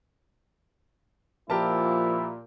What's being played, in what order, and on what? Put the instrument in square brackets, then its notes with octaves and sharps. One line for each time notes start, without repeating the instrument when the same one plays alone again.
[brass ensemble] A#2 [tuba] F3 [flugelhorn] E4 [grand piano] G4 A#4 A5